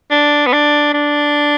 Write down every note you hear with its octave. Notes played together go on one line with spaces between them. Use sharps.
D4
B3
D4
D4